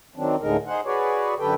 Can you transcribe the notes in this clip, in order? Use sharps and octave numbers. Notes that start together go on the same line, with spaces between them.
D#3 F#3 C4 D4
D2 A2 D3 G#3 D#4 A#4
D#4 G#4 C5 F#5
F#4 G#4 B4 C#5 D5
F#2 D3 G4 A4 B4 G5